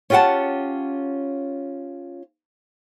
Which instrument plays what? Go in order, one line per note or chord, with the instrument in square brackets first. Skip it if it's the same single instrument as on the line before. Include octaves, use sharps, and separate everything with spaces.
[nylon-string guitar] C#4 F4 G4 A#4 F#5 A5